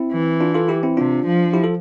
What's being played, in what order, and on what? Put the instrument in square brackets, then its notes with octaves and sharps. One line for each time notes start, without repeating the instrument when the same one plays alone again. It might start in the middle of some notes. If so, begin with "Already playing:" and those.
Already playing: [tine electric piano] C4 E4
[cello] E3
[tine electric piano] D4 F4
F4 A4
E4 G4
C4 E4
[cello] C3 [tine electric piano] D4 F4
[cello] F3
[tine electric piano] E4 G4
F4 A4